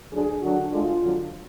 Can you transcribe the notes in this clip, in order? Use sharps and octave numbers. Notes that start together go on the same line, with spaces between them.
D2 D3 F#3 D4 G#4
D3 F#3 D4 F#4
D2 D3 G#3 D4 F4
F2 D3 F#3